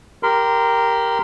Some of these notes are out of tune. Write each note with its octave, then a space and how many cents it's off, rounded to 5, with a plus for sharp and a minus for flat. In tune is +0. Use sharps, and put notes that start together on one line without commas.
G4 +0 A#4 +0 C6 -35